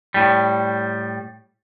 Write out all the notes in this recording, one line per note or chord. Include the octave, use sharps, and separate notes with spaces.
A2 G3